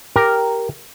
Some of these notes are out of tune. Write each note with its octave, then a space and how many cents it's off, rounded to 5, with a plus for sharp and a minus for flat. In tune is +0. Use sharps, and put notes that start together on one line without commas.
G4 +0 A#4 +0